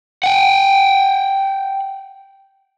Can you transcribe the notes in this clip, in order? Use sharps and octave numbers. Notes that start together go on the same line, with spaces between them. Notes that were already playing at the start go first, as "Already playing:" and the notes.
F#5 G5